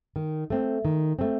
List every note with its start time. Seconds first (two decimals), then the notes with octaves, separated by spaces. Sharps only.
0.16 D#3
0.50 A3 C4
0.85 D#3
1.19 A3 C4